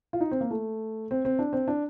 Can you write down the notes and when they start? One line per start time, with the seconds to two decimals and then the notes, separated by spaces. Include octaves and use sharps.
0.13 F4
0.21 D#4
0.31 C4
0.41 A#3
0.51 A3
1.11 C4
1.25 C4
1.39 D4
1.53 C4
1.68 D4